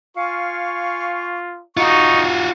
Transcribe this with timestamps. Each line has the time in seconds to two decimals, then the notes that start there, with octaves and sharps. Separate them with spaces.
0.17 F4 F5 G#5 C#6
1.77 D#4 F4 F#4 C#6